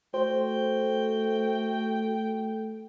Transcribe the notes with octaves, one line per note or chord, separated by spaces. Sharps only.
A3 F#4 C5 G5